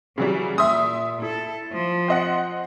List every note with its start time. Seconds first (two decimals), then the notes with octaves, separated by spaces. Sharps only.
0.18 C#3 E3 F#3 G3
0.58 A#2 E5 C6 D#6
1.22 E4 A4
1.72 F3
2.08 C4 D#5 F#5